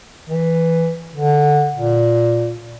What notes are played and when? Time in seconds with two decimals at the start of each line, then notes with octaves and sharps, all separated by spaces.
0.29 E3
1.15 D3
1.76 A#2